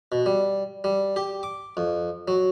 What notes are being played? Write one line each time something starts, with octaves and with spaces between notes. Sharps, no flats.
B2
G3
G3
G4
D6
F2
F#3